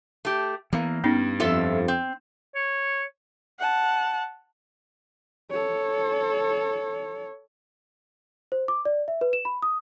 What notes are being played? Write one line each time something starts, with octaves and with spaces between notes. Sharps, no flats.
A3 G4
E3 A#3 B3
G2 B3 C#4 D#4
F2 F4 A4 E5
C4
C#5
F#5 A5
A4 C#5
C5
D6
D5
E5
B4
E7
B5
D#6